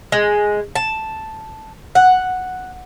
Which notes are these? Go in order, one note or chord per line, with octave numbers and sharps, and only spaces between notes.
G#3
A5
F#5